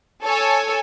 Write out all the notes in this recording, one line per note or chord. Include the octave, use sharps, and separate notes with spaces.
A4 C#5 G#5